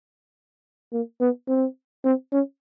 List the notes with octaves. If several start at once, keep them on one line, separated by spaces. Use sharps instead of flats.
A#3
B3
C4
C4
C#4